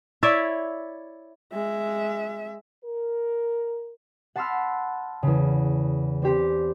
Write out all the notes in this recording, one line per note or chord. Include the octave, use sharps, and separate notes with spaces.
E4 C#5 D5 E5
G#3 E5
A#4
F#5 A5 B5 C6 E6 F6
E2 C#3
C4 D4 G4 C5